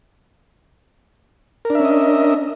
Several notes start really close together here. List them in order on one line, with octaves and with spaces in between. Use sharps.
A#4 D4 E5 C#4 D#5